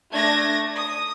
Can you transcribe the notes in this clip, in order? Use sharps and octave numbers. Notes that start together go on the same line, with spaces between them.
A3 D4 G#6 A#6
D#6